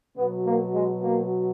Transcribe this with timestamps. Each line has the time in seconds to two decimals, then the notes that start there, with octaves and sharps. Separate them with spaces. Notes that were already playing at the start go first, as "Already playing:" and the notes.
0.16 B2 F#3 B3
0.46 A#3
0.74 G#3
1.03 A#3